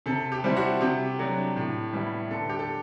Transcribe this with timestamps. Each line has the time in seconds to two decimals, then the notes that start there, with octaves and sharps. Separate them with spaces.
0.06 C3 A4
0.32 G4
0.44 G3 C4 E4
0.57 F#4
0.81 C3 G4
1.19 F#3 A3 D4
1.56 A2
1.93 G3 B3 E4
2.31 D3 A4
2.49 G4
2.59 A4